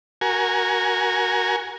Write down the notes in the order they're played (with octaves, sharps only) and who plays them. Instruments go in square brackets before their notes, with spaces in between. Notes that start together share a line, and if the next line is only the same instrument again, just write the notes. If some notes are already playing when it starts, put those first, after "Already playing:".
[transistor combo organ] F#4 A#4 G#5